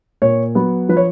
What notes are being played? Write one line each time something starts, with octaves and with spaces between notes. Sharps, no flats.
A#2 C#5
F#3 B3
F3 B4
C#5